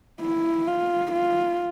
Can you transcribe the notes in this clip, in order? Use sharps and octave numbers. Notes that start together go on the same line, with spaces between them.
E4
F4
F4